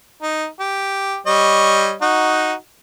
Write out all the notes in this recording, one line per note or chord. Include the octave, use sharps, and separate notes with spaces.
D#4
G4
G3 C#5 D#5
D#4 F#4